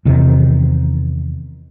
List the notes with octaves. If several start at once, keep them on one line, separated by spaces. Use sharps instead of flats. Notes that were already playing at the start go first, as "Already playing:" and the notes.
E2 C3 D#3